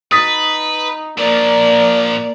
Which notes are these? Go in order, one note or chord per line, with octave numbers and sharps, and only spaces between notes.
D#4 B4 D#6 A6 B6
A#2 F3 A#3 D5